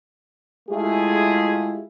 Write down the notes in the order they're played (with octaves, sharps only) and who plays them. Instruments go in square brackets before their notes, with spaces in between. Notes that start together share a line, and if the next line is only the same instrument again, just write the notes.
[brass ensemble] G#3 A3 E4 F4 G4 G#4